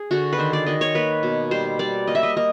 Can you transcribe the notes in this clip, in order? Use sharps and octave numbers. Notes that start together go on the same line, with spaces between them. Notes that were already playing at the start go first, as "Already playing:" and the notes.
Already playing: G#4
D3 F#4
B4
D#3 C5
D5
D#3 D#5
C#5
A#3 B4
B2
G3 C5
G3 D5
A#3 D#5
E5
D#5
A#3 D#5